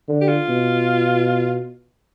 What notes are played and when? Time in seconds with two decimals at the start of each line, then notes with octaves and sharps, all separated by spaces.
0.08 D3
0.21 G4
0.28 F4
0.49 B2